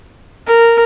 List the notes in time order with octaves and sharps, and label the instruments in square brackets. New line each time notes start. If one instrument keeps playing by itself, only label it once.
[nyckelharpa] A#4